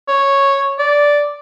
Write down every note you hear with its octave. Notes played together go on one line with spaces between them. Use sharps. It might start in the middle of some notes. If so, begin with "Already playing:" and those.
C#5
D5